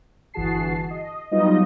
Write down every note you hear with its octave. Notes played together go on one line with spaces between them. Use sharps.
G1 E3 F#4 G#4 A5 C7
D#5
F#3 G3 B3 D#4 F4 D#5